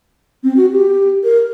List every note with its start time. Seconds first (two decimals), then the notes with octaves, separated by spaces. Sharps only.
0.44 C4
0.57 F#4
0.71 G4
1.24 A#4